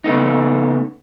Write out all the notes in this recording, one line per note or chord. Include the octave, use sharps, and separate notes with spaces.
C#3 A3 B3 D#4